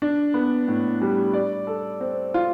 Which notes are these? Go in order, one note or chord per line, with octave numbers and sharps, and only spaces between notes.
D4
B3
A2
G3
D5
A4
C4
F4